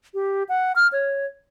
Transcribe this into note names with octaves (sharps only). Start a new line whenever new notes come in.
G4
F#5
F6
C#5